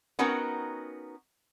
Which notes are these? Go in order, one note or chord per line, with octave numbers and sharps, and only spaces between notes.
B3 C#4 D#4 F#4 A#4 G5